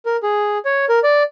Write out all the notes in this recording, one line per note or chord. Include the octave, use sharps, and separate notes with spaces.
A#4
G#4
C#5
A#4
D5